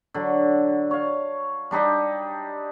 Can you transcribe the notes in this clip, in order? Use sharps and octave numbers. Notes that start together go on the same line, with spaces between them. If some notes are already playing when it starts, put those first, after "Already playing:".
D3 F#3
C#5 F5
G3 D4 D#4 G4